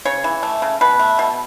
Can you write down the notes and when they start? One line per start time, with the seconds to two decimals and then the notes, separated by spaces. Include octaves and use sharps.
0.05 C#3 C#5
0.24 E3
0.43 A3
0.62 C#3
0.81 B2 B4
0.99 A3
1.19 B2